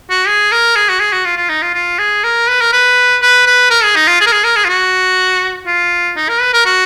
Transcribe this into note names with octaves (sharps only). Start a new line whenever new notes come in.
F#4
G#4
A#4
G#4
F#4
G#4
F#4
F4
F4
D#4
F4
F4
G#4
A#4
B4
A#4
B4
B4
B4
A#4
G#4
D#4
F4
G#4
A#4
G#4
A#4
G#4
F4
F#4
F4
D#4
A#4
B4
A#4
F#4